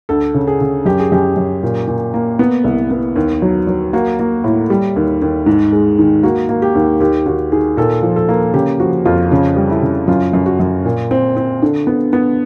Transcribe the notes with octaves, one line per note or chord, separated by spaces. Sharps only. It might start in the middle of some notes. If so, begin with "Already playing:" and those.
D2 A4
C#3
G#4
C#3
F#2 G4
G#4
F#2 G4
F#2
A#2
A#2
A#3
B3
C2
B3
D#2
F#3
F#3
A#3 F#4
A#3
A2
G3
D#2
D#2
G#2
G#3
D#3
A#3 F#4
A#3
G4
D#2
D#2 G4
D#2 F#4
D#3 G#4
A#2 A4
F3
A4
A#3
C#3 G4
F3 F#4
F2 F4
C#3 F4
G3
E4
C#3
F#2 F4
F#2
F#4
F#2
A#2
C4
C4
D3
B3
B3